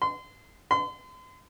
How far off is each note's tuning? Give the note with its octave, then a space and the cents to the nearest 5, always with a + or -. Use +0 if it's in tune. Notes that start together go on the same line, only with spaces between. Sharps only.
C6 -30
C6 -40